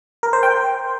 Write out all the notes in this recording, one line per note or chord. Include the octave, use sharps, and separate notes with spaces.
A#4
C5
G5